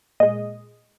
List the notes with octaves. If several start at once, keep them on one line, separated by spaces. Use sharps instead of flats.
A#2 G#3 D#5